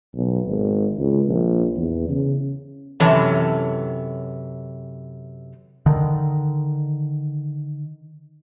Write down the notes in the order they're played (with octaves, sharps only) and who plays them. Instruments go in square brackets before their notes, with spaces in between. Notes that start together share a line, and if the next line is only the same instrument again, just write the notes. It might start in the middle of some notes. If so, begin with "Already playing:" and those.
[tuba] B1
G#1
C#2
A#1
E2
C#3
[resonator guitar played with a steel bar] F#2 C3 E3 A4 C#5 A5
[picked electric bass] D3 D#3